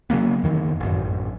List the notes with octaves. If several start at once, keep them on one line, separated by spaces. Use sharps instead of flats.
C#3 F#3 A#3 B3
F2 D#3 E3
A1 F#2